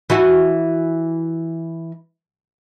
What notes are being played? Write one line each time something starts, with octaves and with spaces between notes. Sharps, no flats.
E3 E4 F#4